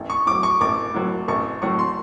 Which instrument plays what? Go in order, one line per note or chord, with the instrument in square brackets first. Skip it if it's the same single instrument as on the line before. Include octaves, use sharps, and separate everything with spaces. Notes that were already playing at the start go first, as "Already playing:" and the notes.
Already playing: [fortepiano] A1
[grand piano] C#6
[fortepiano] A2 [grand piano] D6
[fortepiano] F#3
[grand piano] C#6
[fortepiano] A1 [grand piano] D6
[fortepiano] A2 F#3
[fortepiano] A1 [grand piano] C#6
[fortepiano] A2 F#3 [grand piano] C#6
[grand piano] C6